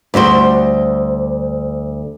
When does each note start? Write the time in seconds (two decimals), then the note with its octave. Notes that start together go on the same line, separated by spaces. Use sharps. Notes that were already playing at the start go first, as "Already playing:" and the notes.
0.14 D2 G3 F#4 C5